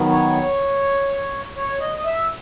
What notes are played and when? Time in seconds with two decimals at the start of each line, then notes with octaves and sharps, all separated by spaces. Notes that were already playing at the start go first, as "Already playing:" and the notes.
Already playing: D#3 F#3 B3
0.09 C#5
1.56 C#5
1.80 D#5
1.98 D#5
2.05 E5